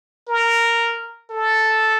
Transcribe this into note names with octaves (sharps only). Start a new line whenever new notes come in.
A#4
A4